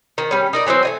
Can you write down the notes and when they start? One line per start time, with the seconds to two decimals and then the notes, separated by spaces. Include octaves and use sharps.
0.18 D#3
0.31 G3 C#4
0.53 D#4 A#4 D5
0.66 E3 F#3 G3 C4
0.83 A3 D#5 G#5